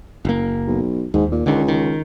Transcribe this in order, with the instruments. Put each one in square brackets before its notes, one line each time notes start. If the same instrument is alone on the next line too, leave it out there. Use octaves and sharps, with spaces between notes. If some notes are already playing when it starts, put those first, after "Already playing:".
[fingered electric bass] F#1 A#3
[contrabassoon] B1
[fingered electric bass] D#2 [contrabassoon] G#2
[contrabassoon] A#2
[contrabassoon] C#2 [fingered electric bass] D3 D#3
[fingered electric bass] D#3